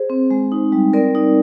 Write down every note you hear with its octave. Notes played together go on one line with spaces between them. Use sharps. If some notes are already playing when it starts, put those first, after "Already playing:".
Already playing: G#4 C5
C4
G#3
D#4
G3
C4 A#4 D5
D#4